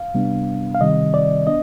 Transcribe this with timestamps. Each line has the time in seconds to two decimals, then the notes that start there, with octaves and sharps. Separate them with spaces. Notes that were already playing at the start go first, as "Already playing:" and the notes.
Already playing: F5
0.14 C3 G3 B3 D4
0.75 F5
0.81 C3 D#3 G3 C4 D#5
1.14 D5
1.47 B3 D4 D#5